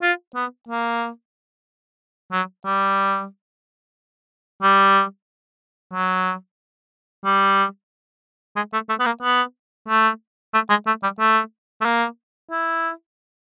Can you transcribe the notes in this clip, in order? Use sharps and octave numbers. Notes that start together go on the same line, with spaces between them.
F4
B3
A#3
F#3
G3
G3
F#3
G3
G#3
A3
A3
B3
A#3
B3
A3
A3
G#3
A3
G3
A3
A3
A#3
E4